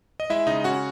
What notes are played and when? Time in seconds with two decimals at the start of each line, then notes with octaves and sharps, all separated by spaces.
0.20 D#5
0.30 G#3 E4 E5
0.47 C#3 D#4 D#5
0.64 C#4 F#4 F#5